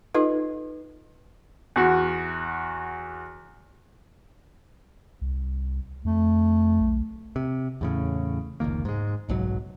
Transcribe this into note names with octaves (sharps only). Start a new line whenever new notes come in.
D#4 F4 A4 B4 D#5
E2 F#4
C2
F2 A3
B1
C3
E2 A2 C#3
F1 C#2 D#3 A#3
G#2 G#3
F#1 B1 G#2 F#3